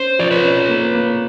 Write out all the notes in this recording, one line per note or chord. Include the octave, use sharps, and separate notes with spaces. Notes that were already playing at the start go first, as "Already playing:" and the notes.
Already playing: C#4 C5
F3 D5
B4 C#5
C#4
A#3
A#3